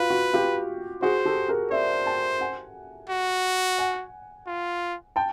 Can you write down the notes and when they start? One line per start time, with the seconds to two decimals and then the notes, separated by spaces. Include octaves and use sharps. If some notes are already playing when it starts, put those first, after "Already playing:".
Already playing: F4 F#4 B4
0.10 F#4
0.34 F4 G4
1.02 F#4 G#4 C5
1.25 G4 A4
1.48 G#4 A#4
1.71 C5 D5 E5
2.06 G5 A5
2.41 F#5 G#5
3.10 F#4
3.78 F#5 G#5
4.47 F4
5.16 G5 A5